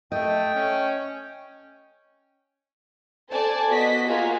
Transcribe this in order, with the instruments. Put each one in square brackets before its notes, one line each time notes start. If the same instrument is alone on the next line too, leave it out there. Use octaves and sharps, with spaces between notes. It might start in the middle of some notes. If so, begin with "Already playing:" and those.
[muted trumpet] A3 [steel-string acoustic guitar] D#5 [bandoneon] G5
[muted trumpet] C#4
[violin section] A4 C5 D5 G#5 A5
B3 F#4 D#5 B6
A#3 F4 F#4 G#4